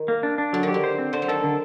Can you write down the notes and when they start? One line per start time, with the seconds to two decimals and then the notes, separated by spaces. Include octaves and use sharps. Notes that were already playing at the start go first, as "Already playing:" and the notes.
Already playing: D#3
0.08 A#3
0.23 D4
0.38 D4
0.53 D3 F#3
0.63 D#3 G4
0.74 D3
0.84 C5
0.98 C4
1.13 D3 C5
1.22 F#3
1.28 D#3 A4
1.43 D3